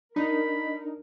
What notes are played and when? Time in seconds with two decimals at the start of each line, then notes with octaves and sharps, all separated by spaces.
0.16 D4 D#4 A#4 B5